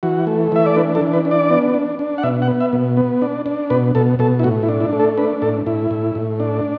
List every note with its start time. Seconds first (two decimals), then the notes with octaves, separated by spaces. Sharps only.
0.03 E3 F#4
0.27 A3
0.52 E3 E5
0.66 D5
0.76 D4 B4
0.95 A4
1.01 E3
1.13 B4
1.25 D4
1.31 D5
1.50 B3
1.74 D4
1.99 D4
2.18 F#5
2.23 B2 E5
2.42 F#5
2.48 B3
2.60 E5
2.73 B2
2.97 B3
3.22 D4
3.46 D4
3.70 B2 B4
3.95 B2 A4
4.19 B2 A4
4.39 E4
4.43 A2 F#4
4.63 E4
4.69 D4
4.80 E4
4.93 A3
5.00 A4
5.18 D4 B4
5.42 A2 A4
5.66 A2 E4
5.91 A2
6.15 A2
6.40 D4